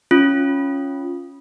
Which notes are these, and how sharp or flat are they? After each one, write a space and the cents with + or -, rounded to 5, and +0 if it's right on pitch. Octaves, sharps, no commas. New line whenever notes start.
C#4 +0 F4 +0